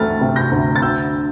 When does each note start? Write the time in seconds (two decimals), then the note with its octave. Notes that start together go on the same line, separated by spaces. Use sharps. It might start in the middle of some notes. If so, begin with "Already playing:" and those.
Already playing: D2 E3 A3 F6 A6
0.21 C3
0.36 G6 A#6
0.51 D2
0.76 A6
0.82 D3 E6 G6